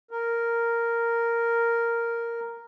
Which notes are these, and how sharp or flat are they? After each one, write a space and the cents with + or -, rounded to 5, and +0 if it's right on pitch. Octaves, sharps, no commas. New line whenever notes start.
A#4 -5